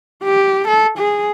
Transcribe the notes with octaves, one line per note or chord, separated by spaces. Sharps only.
G4
A4
G#4